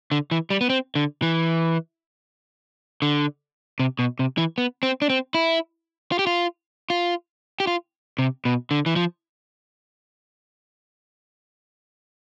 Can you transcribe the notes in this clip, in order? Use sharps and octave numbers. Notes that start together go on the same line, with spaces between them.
D3
E3
G3
B3
C4
D3
E3
D3
C3
B2
C3
E3
B3
C4
D4
C4
E4
F4
G4
F4
F4
G4
F4
C3
B2
D3
E3
F3